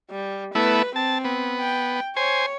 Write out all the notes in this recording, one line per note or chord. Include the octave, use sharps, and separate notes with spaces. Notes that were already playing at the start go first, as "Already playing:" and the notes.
G3
A3 B3 E4 B4
C4 A5
B3
G5
C5 C#5 G#5